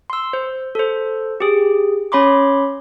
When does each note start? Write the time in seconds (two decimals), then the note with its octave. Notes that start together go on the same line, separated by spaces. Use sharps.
0.10 C6 E6
0.33 C5
0.75 A4 C5
1.40 G4 G#4
2.12 C#4 C#5 B5 C6 D6